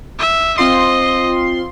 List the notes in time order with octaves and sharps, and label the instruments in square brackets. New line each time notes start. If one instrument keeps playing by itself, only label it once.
[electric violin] E5
[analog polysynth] C4 F4 C6 [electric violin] D#5